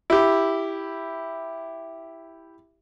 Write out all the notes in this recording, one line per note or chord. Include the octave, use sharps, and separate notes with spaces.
E4 G4